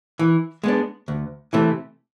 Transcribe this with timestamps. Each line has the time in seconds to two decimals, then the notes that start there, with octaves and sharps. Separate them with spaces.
0.19 E3
0.64 G#3 B3 D4
1.08 D2
1.53 C3 E3 A3